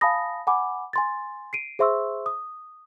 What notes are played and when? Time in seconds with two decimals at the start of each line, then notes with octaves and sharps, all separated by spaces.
0.01 F5 G#5 A5 B5 D#6 A#6
0.47 F#5 G#5 B5 D6
0.93 G#5 C6 A6
1.53 C7 D7 D#7
1.79 G#4 C5 E5 C6 C#6 E6
2.26 D#6